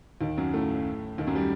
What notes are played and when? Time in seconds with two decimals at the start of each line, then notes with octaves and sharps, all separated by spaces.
0.21 D#2 D#3
0.37 F#2 F#3
0.53 A2 A3
1.18 D#2 D#3
1.27 F#2 F#3
1.36 G3